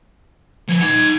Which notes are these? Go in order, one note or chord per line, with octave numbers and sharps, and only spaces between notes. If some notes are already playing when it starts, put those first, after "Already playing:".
F3 B4 G#6
D#4 F#5 G#6